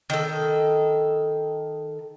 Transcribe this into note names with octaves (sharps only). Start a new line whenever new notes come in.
D#3 A4